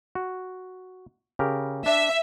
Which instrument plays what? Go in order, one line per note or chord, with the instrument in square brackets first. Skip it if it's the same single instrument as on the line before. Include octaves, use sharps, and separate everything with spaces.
[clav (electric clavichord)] F#4
C#3 G4 A#4
[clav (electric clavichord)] D4 [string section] E5